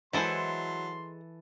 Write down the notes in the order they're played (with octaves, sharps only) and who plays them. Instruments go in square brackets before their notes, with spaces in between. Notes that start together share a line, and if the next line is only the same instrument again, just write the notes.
[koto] E3 A4 [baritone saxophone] F#3 [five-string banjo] G#3 E4 C5 [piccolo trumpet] C6